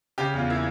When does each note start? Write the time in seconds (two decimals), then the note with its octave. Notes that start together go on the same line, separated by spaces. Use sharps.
0.18 C#3 G4
0.34 E2 F4
0.49 A#3 E4